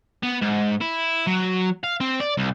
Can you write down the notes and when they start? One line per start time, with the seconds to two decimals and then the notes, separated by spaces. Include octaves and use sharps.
0.23 B3
0.42 G#2
0.81 E4
1.27 F#3
1.84 F5
2.01 C4
2.20 D5
2.37 C2